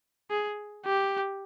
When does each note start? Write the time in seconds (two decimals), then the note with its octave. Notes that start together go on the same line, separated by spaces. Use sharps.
0.31 G#4
0.85 G4